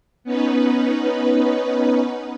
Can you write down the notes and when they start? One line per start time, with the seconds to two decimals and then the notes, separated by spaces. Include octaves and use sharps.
0.24 B3 C#4 D#4 B4